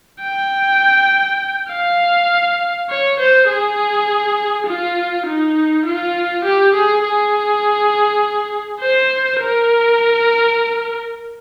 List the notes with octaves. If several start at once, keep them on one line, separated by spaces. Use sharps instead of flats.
G5
F5
C#5
C5
G#4
F4
D#4
F4
G4
G#4
G#4
C5
A#4